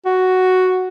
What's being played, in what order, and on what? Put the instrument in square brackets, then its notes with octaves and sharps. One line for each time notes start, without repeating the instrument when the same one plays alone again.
[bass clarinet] F#4